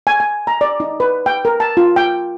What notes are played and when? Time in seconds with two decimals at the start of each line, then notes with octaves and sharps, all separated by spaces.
0.07 G#5
0.20 G#5
0.47 A#5
0.61 D5
0.80 D#4
1.00 B4
1.26 G5
1.45 A#4
1.60 A5
1.77 F4
1.96 G5